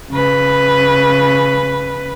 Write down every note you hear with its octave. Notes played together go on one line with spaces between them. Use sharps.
C#3 B4